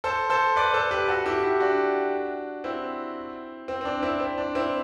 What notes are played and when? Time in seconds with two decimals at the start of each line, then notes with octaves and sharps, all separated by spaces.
0.04 A4 C5
0.30 A4 C5
0.56 B4 D5
0.73 A4 C5
0.91 G4 B4
1.08 F#4 A4
1.26 E4 G4
1.42 E4 G4
1.60 D4 F#4
2.64 C4 E4
3.68 C4
3.81 C4
3.85 D4
4.03 C4 E4
4.20 C4
4.38 D4
4.55 C4 E4